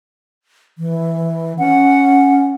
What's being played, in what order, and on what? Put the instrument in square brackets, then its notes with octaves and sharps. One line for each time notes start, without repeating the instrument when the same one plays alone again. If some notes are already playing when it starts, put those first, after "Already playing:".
[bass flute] E3
[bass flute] C#4 [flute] F#5